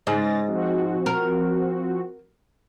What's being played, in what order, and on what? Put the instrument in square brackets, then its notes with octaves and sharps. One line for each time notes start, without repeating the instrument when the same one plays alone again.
[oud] G#2 [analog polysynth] C#3 A6 A#6
[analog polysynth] F3 C4 F#4
[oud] A#4